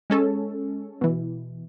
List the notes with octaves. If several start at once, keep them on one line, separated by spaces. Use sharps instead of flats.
G#3 C#4 A4
B2 E3